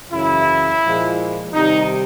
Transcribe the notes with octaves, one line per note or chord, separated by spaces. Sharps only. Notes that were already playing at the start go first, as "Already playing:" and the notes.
F#2 C#3 E3 E4
A#2 F3 G#3
C3 D#3 G3 D#4